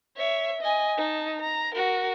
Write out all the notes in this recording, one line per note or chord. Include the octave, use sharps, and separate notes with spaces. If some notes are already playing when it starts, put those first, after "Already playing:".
C#5 E5
D#5 G#5
D#4 A5
A#5
F#4 A#4